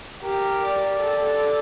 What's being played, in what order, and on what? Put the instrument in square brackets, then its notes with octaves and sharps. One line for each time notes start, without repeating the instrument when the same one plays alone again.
[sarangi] G4 [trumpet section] A#4
[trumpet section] D5
[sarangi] A4